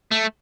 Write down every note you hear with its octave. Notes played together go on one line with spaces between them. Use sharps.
A3